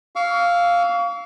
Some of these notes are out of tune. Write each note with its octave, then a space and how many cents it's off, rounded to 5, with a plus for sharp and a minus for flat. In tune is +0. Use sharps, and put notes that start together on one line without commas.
F5 +0 C#6 +40 E6 +0